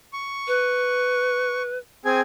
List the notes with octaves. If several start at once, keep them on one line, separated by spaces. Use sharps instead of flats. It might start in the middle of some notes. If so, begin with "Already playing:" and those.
C#6
B4
C4 G#4 G#5